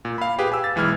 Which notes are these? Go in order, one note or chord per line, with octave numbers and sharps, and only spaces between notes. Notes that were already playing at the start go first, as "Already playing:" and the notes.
A#2
F5 B5
G4 G#4 B4
G#5 E6
A6
B1 E3 G#3 F6 G#6